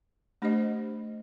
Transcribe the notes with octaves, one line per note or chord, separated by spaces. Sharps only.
A3 D4 G4 C5 D#5